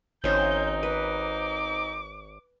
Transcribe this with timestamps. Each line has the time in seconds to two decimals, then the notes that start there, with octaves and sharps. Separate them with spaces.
0.24 G#1 A#3 C4 C#4 D#4 C5 G6
0.83 B4 D6